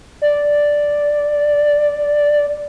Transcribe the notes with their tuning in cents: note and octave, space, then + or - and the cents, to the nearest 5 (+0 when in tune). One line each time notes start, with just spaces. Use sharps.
D5 +0